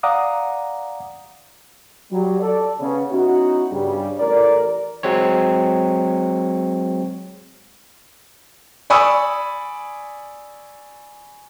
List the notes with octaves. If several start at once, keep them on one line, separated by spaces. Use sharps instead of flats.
D5 F5 F#5 A#5 D6 D#6
F#3 G3
A4 D5
C#3 B3
B3 C#4 D#4 E4 F#4
G2 C#3 G3
A1 A#4 D5
F#3 G#3 C4 C#5
D5 G#5 B5 C#6 D#6 E6